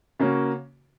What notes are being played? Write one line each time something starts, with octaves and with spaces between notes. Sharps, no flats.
C#3 A#3 C#4 F#4